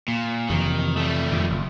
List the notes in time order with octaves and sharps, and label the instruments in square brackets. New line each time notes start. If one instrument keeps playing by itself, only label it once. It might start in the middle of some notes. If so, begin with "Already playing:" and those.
[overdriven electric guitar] A#2
[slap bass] F2 C3 E3 [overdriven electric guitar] D#3
[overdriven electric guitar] G3 A3
[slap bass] F2 A#2 D#3
F#1